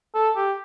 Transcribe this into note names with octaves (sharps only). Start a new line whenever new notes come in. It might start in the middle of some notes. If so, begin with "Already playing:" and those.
A4
G4